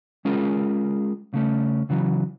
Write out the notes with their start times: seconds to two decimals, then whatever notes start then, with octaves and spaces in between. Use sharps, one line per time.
0.25 G#3 C#4 F4 G#4 A#4
1.34 C#3 A3 C#4
1.90 C#3 E3 F#3